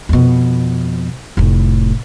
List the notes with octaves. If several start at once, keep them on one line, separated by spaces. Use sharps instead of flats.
F2 B2
F1 A2